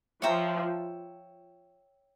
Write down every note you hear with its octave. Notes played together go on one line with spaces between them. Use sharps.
F3 C#5 E5 G5 A#5